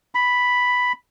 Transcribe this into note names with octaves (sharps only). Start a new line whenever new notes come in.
B5